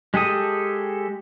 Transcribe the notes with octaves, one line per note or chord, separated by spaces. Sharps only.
G#3 G4 A4 D#6